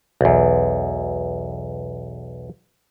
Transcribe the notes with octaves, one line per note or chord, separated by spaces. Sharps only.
B1 E2